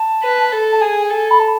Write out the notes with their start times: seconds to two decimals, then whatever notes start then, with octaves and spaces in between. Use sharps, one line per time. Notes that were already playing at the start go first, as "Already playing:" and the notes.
Already playing: A5
0.23 B4
0.52 A4
0.71 A5
0.81 G#4 G#5
1.10 A4 G#5
1.30 B5
1.39 A5